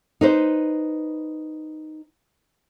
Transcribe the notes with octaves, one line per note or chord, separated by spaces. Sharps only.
D#4 B4 C5